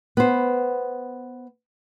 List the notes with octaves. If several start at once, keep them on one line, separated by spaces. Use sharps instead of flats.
B3 C5